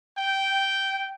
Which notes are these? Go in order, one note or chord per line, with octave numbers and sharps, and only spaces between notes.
G5